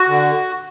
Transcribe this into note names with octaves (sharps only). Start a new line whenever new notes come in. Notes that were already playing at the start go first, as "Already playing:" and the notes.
Already playing: F#4
D3